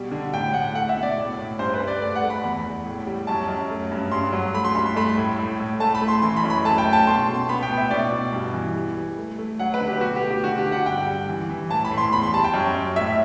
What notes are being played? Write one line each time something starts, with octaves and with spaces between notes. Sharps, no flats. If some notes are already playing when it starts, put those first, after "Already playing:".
Already playing: B2 G3
D3
A2 G5
A2 F#5
A3 F#5
E5
B2
D5
A2
A2
G2 C5
B4
G2
D5
A3 D5
F#5
A3
B5
E2 B5
E2
A2
G3
F#2 A5
F#2
A3
G2
G2 C6
F#3
A3 B5
C6
G2 B5
C6
A3 B5
A2
A2
A2
A3 A5
B5
A3
C6
E3 C6
B5
F#2
B5
A3 A5
G5
A3
A5
B2 C6
B2
C6
B3 B5
G5
A2
E5
B2 D5
B2
G2
E3
G3
G3
A3
A3
F#3 F#5
B4
D3
G4
B2 F#4
G4
A3
G4
D3 F#4
G4
D3
F#5
G2 G5
G3
E3
E3
A2 A5
B5
A2
C6
E2 B5
C6
G3 A5
G5
F#2
F#2
A2 E5